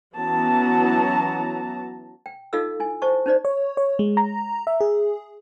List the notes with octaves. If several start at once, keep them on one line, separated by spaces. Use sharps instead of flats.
E3 F#3 B3 C#4 A5 A#5
G5
D#4 F4 A4 D#5 F5 E6
E4 G#5
C5 D#5 A5 C#6
C#4 D#4 C5 D5
C#5
C#5
G#3
A#5
E5
G#4